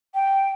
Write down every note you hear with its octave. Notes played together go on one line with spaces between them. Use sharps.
G5